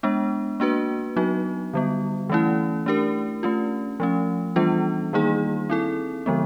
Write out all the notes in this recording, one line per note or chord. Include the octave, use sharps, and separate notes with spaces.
G#3 B3 D4
A#3 D4 F#4 B4
F#3 B3 D#4 F#4
D3 G3 B3
E3 A3 C#4 E4
A3 D4 G4 A#4
A3 C#4 F4
F3 A3 C#4
E3 G3 B3 D4 F4
D#3 G3 A#3 D#4 G#4
C4 E4 A4
D3 F3 G#3 B3